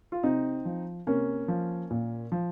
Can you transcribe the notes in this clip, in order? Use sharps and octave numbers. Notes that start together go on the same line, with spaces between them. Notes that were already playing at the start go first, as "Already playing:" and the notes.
F4
C3 C4 D#4
F3
C3 A#3 C#4
F3
A#2
F3